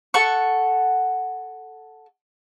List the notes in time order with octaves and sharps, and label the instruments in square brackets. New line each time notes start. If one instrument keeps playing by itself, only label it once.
[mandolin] A4 F#5 C#6